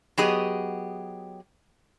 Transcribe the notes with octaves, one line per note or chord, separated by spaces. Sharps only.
F#3 B3 G4 G#4 D#5